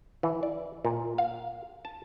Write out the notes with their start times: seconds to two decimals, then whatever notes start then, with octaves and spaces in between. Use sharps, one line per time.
0.23 E3
0.43 D5
0.85 A#2
1.18 F5
1.85 A5